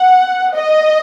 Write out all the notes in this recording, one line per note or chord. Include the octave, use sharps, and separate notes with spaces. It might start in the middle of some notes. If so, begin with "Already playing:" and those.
Already playing: F#5
D#5